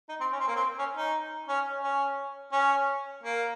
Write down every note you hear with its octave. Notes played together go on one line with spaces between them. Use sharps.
D#4
C4
C#4
C4
A#3
C4
C#4
D#4
C#4
C#4
C#4
A#3